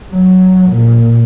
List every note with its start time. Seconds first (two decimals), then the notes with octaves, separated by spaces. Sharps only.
0.13 F#3
0.70 A#2